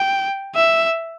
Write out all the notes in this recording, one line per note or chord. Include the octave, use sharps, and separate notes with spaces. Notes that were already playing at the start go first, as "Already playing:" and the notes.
Already playing: G5
E5